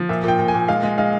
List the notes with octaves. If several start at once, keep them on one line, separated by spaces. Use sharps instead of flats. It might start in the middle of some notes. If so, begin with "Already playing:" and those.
Already playing: F3
A#2 E5
A#2 G5
A#2
G#5
A#2
G#3 F5
G#3
G#3 F5